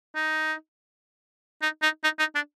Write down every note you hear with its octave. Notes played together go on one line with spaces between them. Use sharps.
D#4
D#4
D#4
D#4
D#4
D4